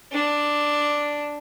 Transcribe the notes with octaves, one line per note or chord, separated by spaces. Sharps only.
D4